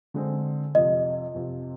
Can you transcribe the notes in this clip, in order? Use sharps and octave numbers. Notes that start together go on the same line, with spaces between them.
D3 G#3 C4
F2 C3 F3 D#5
F2 C3 F3